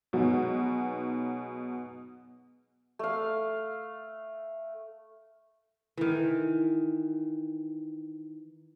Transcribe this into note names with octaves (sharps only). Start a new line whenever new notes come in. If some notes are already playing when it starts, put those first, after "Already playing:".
B2 F#3 G#3 B3 D#4 F#4
A3 F5
D#3 E3